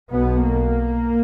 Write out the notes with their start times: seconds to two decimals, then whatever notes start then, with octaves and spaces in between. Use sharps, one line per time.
0.11 B1 B2 B3
0.43 A#3